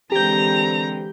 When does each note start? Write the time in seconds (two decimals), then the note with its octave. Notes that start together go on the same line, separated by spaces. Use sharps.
0.12 D3 E3 G#3 C4 G4 A#5 G6